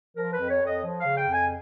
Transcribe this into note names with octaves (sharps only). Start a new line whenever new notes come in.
F3 A#4
B4
F2
C#5
F2
D#5
F3
C#3 F5
G5
F2 G#5